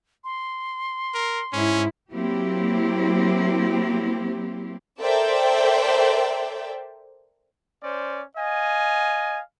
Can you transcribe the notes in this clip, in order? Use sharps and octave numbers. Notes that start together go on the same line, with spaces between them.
C6
A#4
G#2 C#4 E4
F#3 A#3 C4 E4 G4
A4 A#4 C5 D5 E5 G5
C#4 C5 D5
D#5 F5 G#5